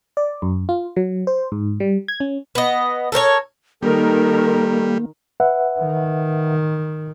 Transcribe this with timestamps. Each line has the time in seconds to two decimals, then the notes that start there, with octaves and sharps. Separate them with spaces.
0.17 D5
0.42 F#2
0.69 F4
0.96 F#3
1.27 C5
1.52 G#2
1.80 G3
2.08 G#6
2.20 C#4
2.55 B3 D#5
3.12 A4 A#4 C5 C#5
3.82 D#3 G3 A#3 A4 A#4
5.40 B4 E5 F#5
5.80 D#3